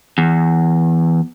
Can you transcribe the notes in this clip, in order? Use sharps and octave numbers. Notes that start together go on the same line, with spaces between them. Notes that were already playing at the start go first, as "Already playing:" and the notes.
E2